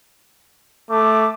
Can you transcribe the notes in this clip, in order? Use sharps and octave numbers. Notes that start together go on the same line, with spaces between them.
A3 D6